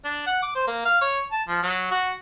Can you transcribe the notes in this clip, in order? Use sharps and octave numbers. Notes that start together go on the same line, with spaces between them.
D4
F#5
D6
C5
A#3
F5
C#5
A5
F3
F#3
F#4